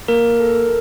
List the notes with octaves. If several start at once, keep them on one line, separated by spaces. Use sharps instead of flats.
A#3 A#4
A4